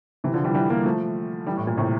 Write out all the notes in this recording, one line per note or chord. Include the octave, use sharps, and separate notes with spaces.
C3 E3
D3 F3
E3 G3
E3 G3
G3 A#3
F3 A3
E3 G3
A2
A#2
A2 C3